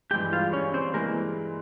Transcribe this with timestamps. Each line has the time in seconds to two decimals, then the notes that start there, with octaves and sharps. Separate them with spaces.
0.11 G2 E3 G#3 G4 G5
0.33 F4 F5
0.53 C#4 C#5
0.74 C4 C5
0.94 E3 G#3 A#3 A#4